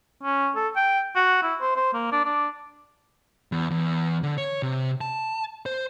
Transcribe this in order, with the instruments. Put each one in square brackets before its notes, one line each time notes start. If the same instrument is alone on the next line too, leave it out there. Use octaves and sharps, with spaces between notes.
[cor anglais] C#4
A4
G5
F#4
E4
C5
C5
A#3
D4
D4
[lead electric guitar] E2
E2
D3
C#5
C3
A5
C5